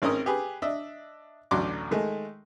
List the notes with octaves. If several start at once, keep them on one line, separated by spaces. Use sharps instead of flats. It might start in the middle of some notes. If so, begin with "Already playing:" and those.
G#1 C4 C#4 A#4 D#6
G4 G#4 B4
D4 D#5 E5
A1 D2 F#3 C6 D6
D#3 G#3 A3